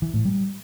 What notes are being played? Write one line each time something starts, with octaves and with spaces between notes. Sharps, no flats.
E3
A2
G3